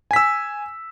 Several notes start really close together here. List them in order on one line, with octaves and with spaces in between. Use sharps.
G#5 B6 E6